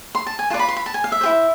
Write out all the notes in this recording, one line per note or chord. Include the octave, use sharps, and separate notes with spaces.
C6
A5
G#5
F4 B4 D5 A5
B5
C6
B5
A5
G#5
F5
E5
E4 G#4 C5